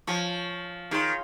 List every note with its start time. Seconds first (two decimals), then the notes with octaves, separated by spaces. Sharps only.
0.07 F3 C#5 G#5 C#6
0.91 D#3 G#4 C#5 F5 C6